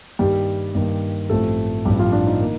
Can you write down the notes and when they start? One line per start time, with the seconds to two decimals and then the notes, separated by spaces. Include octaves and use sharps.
0.19 G2 D#3 G3 A#3 G4
0.75 G2 D#3 G3 A#3
1.30 A1 G2 F3 A3 C4 A4
1.85 A1 G2 F3 G3 C4 G4
1.99 F3 F4
2.12 D4
2.27 D#4
2.41 D#3 A#3